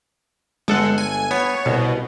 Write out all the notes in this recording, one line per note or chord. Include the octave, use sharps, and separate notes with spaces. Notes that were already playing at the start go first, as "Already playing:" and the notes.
G1 G#3 A4 F#5
G#5
B3 C#5
C2 B2